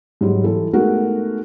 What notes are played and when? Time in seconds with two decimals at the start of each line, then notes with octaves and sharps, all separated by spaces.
0.21 G#2 F#3 G3
0.44 E3 A4
0.73 G#3 A3 B3 D#4 F#4 A#4